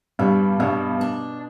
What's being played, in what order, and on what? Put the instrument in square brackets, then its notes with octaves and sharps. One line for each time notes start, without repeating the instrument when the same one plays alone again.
[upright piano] G2 G3 [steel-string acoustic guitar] B2
[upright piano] G2 G3 [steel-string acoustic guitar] B2
[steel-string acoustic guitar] D4